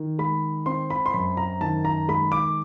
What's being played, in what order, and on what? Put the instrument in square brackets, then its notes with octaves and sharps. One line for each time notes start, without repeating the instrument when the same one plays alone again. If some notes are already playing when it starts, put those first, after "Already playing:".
Already playing: [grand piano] D#3
G#3 B5
C4 C6
B5
C6
F#2 B5
A#5
D#3 A5
A#5
G#3 B5
D6